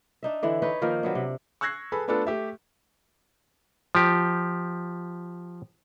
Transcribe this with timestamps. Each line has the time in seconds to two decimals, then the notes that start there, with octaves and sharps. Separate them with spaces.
0.23 D4 D#4 E5
0.43 D3 E3 E4
0.62 D#4 B4 C#5
0.81 D#3 F3 A#3 A#4
1.03 F#3 B3 D4
1.15 C3
1.61 C#6 E6 F#6 G#6 A#6 C7
1.92 G#4 A4 B4 B5
2.08 A3 B3 D4 F4 A4 B4
2.27 A3 G4 E5
3.95 F3 G4